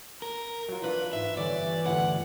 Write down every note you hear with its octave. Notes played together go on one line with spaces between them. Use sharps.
A#4
F#3 F4
E3 D4 F4 B4
G#2 E5
G1 E3 C#5 D5
G1 D2 E4 F#5